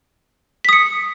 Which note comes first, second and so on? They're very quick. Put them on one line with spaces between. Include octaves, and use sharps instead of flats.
B6 D#6 C#7